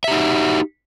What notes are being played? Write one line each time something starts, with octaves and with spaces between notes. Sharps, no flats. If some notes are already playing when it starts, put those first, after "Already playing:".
D#4 F#4 G4 E5